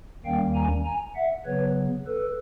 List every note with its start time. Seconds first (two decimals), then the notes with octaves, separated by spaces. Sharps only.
0.25 D#2 D#3 G3 A#3 C#4 F5 G5
0.55 G#5 A#5
0.85 G#5 A#5
1.15 E5 F#5
1.45 C#3 F#3 B3 B4 C#5
2.07 A4 B4